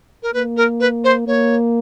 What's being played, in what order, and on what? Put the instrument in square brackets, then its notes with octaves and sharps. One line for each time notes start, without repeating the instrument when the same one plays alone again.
[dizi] A#4
[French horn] A#3 [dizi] B4
[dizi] A#4
B4
C5
[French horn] A#3 [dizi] C#5